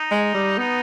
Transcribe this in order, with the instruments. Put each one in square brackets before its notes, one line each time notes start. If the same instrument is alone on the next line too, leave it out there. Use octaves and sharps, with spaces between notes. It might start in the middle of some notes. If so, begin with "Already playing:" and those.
Already playing: [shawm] D#4
[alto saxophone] G#3
G3
[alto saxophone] B3 [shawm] D#4